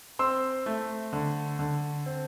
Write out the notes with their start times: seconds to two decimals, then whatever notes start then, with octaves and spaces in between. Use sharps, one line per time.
0.19 C4 C6 E6
0.66 A3
1.13 D3
1.59 D3
2.06 C4